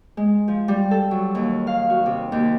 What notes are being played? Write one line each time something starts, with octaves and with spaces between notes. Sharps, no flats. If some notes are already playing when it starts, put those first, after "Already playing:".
G#3
F3
G3
A4
F#3
D#2
F5
F#4
C3
D#2